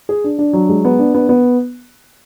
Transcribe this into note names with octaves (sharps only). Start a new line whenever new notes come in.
G#4
D4
D4
F#3
G#3
B3
D4
B3
B3